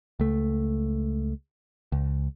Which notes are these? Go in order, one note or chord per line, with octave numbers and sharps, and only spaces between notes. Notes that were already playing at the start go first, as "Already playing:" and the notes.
C#2 A3
C#2